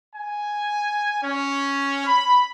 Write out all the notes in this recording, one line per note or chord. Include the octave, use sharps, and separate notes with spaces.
G#5
C#4
B5